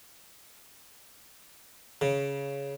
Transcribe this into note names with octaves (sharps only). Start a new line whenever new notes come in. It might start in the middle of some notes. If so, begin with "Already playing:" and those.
C#3